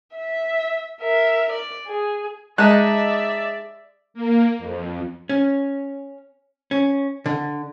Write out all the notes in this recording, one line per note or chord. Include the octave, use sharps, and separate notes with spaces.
E5
A#4 E5
D5
G#4
G#3 D#4 D5 E5 A5 F#6
A#3
F2
C#4
C#4
D3